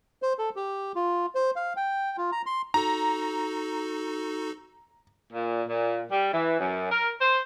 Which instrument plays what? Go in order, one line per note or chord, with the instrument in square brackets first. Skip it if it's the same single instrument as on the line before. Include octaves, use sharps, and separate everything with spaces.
[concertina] C5
A4
G4
F4
C5
F5
G5
F4
A#5
C6
[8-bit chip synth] D#4 F#4 A4 [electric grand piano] A#5
[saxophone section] A#2
A#2
G3
E3
F#2
A#4
C5